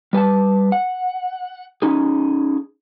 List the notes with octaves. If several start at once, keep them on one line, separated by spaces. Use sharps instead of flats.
G3 B4 G#5 A5
F#5
C#4 D#4 G#4